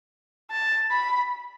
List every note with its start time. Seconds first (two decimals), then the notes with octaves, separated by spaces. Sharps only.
0.51 A5
0.90 B5